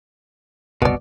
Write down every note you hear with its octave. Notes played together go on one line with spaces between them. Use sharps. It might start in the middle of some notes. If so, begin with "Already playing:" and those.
F#1 C2 B2 B4 D5